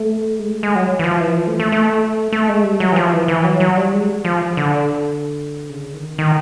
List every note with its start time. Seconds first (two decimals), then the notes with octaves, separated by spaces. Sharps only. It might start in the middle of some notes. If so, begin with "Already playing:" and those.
Already playing: A3
0.39 G#3
0.51 A3
0.63 G#3
0.75 F#3
0.99 E3
1.04 F3
1.20 E3
1.36 F3
1.47 A3
1.60 A3
1.72 A3
2.32 A3
2.49 G#3
2.64 G3
2.80 F#3
2.92 E3
2.96 F3
3.13 E3
3.28 E3
3.44 F#3
3.60 F#3
3.77 G3
3.93 G#3
4.25 F3
4.57 D3
5.70 C#3
5.94 D#3
6.18 D#3